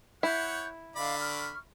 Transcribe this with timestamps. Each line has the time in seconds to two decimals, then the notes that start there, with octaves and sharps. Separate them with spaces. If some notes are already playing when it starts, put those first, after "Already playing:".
0.23 E4 C#5 F#5 G6
0.96 D3 D5 D#5 F5 B5
1.20 C#6 F6